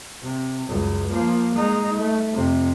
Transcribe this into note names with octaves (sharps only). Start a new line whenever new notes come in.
C3
C#2 F#2
F3 A#3
G#3 D#4
A3
F2 C3